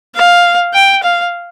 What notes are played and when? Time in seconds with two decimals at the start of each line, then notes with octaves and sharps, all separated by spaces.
0.15 F5
0.74 G5
1.02 F5